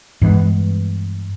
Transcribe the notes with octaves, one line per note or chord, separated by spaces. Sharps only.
G2 E3 G#3 B3